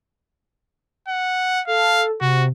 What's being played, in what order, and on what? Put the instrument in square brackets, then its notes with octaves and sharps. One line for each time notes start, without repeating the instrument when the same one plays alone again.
[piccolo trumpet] F#5
[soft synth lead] A4 [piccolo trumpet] F5
[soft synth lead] C3 [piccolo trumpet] F#4